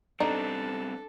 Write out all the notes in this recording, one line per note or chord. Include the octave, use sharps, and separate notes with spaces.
G3 B3 C4 D4 D#4 A4